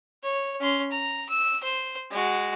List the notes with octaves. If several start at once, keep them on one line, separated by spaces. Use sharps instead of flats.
C#5
C#4 C6
A#5
E6
C5
G#3 F#4